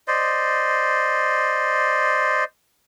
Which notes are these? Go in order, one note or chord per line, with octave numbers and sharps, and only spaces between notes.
C5 D5 D#5